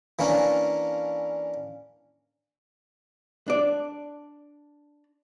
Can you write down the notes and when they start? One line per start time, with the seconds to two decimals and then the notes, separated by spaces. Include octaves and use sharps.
0.19 E3 A#3 C#4 D4
3.48 D4 D5